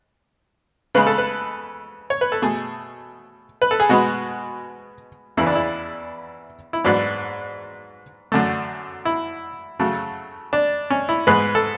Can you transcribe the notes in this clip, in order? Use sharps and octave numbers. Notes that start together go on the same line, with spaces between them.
C#3 G#3 B3 B4
A4
B4
C#5
B4
A4
B2 A3 G#4
B4
A4
G#4
B2 G#3 B3 F#4
E2 C#3 E3 B3 E4
D4
E4
E4
G#2 F#3 B3 D4
F#2 D3 A3
E4
C#3 F#3 A3
D4
C#4
E4
G#2 G#3 B3 B4
A4